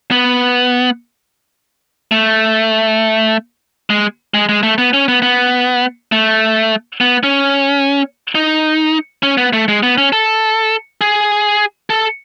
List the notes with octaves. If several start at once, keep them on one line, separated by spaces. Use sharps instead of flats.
B3
A3
G#3
G#3
G#3
A3
B3
C#4
B3
B3
A3
B3
C#4
D#4
C#4
B3
A3
G#3
B3
C#4
A4
G#4
A4